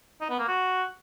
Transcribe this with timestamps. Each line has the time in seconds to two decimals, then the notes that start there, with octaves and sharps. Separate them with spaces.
0.21 D#4
0.30 B3
0.39 A#3
0.48 F#4